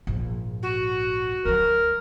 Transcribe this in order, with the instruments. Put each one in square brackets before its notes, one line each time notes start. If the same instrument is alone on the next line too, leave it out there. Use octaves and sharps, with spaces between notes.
[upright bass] A#1 G#2
[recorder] F#4
[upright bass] D2 F#3 [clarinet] A#4